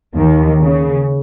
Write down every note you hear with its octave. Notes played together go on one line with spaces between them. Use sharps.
D#2 D#3
C#3